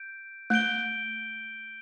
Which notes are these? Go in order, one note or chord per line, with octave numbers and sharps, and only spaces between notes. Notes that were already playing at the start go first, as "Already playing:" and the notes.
Already playing: G6 D7
A3 G6 D7 G7